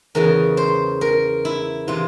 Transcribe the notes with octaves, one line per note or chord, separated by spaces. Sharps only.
E2 C#3 E3 A#4
C5
A#4
E4
C3 E3 F4